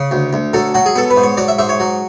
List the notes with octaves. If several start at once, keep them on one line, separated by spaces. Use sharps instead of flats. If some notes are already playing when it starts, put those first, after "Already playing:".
Already playing: C#3
D2
D2
F#3 A4
F#3 F#4
G#4
B3 A4
B4
G#2
C#5
F#3 D5
E5
G#2 E5
C#5
F#3